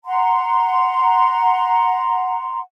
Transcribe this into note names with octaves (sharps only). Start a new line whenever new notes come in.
F#5 A#5 C6